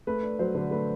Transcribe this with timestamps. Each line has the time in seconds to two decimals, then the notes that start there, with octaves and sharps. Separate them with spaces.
0.07 A3 B4
0.23 D4
0.39 F#3 C5
0.55 D3
0.71 A3 B4